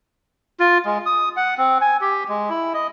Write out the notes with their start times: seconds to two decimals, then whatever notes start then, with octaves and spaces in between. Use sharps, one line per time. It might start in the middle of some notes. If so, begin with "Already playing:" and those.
0.60 F4
0.86 G#3
1.06 D#6
1.37 F#5
1.58 C4
1.81 G#5
2.01 G4
2.29 G#3
2.50 E4
2.74 D#5